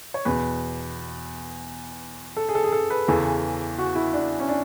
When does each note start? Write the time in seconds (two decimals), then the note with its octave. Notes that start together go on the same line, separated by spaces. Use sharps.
0.14 C#5
0.25 E2 B2 B4
2.37 A4
2.49 G#4
2.55 A4
2.64 G#4
2.73 A4
2.90 B4
3.08 E2 C#3 E3 A4
3.78 F#4
3.96 E4
4.14 D4
4.40 C#4
4.48 D4